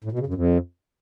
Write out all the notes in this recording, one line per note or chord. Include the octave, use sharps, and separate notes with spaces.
A2
B2
C#3
F#2
F2